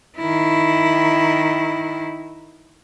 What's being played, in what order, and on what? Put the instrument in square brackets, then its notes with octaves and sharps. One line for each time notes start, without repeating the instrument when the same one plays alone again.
[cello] D#3 E4